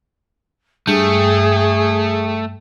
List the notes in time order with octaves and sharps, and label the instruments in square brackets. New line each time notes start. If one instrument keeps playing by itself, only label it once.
[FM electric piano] G2 G5 [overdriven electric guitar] A3 [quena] G#4